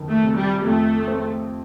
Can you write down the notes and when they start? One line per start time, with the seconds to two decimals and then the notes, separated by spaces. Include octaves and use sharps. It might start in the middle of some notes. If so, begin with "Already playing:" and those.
Already playing: F2 D#3
0.09 A3
0.23 C3
0.37 G3
0.65 F2 A3
1.08 C4